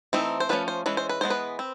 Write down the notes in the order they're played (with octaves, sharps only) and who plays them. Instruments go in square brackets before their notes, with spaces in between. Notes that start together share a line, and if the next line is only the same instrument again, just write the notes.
[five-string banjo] E3 A3 C4 D#4
C5
F3 A3 C#4 B4
C5
E3 G#3 C#4 B4
C5
B4
E3 G#3 B3 C5
B4
C4